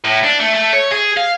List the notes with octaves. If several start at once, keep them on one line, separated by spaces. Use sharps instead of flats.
A2
D4
A3
A3
C#5
G#4
F5